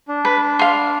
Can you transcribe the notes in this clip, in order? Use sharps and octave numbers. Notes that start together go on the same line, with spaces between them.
D4
B4
F5 C6